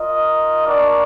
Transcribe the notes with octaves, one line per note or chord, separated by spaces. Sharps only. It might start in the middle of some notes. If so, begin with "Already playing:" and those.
Already playing: F4 A#4 D#5
D4 F#4 A#4 D5 F#5